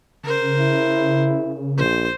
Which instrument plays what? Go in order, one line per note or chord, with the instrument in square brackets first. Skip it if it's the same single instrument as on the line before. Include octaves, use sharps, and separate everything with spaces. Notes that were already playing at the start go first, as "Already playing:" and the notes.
[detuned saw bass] C#3 [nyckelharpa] A#4 C5
[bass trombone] E4
[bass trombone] A#1 [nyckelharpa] C5